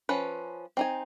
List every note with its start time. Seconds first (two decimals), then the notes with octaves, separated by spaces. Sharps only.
0.09 F3 C#4 B4
0.77 C4 D#4 G#5